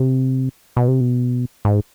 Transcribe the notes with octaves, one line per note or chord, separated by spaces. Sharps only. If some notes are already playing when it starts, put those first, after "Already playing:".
Already playing: C3
B2
C3
B2
G#2